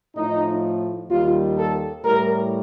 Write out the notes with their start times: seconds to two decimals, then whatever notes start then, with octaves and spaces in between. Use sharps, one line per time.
0.15 A2 F3 D#4
1.09 D#2 D#3 G3 F4
1.56 A4
2.03 A2 G3 A#4